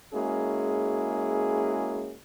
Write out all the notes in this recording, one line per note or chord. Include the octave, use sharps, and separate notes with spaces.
G#3 A#3 C#4 E4 F#4 G#4